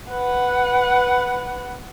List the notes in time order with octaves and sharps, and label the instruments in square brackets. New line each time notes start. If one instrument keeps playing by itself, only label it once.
[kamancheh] B4 F#5